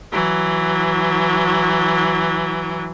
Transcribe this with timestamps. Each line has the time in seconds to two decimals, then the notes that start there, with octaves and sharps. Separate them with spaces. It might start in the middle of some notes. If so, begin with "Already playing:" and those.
0.12 E3 F#3